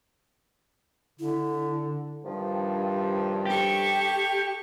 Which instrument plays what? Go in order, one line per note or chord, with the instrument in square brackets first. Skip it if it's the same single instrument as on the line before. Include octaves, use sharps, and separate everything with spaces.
[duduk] D3 [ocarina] E4
[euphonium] G2 [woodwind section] C3 D#3 F3
[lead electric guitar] G4 [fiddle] A4 C#6